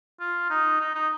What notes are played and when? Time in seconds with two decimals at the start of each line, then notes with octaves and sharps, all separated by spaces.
0.20 F4
0.50 D#4
0.81 D#4
0.95 D#4